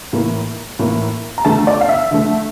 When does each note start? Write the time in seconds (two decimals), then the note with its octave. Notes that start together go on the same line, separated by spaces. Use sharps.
0.13 A2 E3 A#3
0.79 A2 E3 A#3
1.38 A#5
1.45 D3 A3 A5
1.67 D5
1.81 F5
1.89 E5
2.11 D3 A3